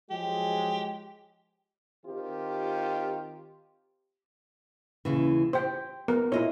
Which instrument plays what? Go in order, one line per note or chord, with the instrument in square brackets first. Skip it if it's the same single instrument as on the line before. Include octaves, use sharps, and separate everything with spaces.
[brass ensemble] F3 F#3 G#3 [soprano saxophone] G4
[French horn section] D#3 C4 F4 G4
[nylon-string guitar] D#2 C#3 E3
[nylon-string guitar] G4 [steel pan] C5 G5
[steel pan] B3 A#4
[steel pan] E4 C#5 [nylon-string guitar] F4 D#5